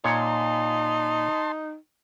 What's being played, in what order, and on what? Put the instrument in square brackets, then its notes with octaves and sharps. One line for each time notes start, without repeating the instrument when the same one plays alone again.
[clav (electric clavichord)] A#2 C#5 [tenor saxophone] D#4 [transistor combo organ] A5 C6